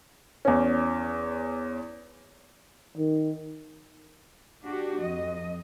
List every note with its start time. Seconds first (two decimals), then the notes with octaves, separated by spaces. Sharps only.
0.45 E2 C#4
2.97 D#3
4.64 D4 F#4 G4
4.99 F2 D#5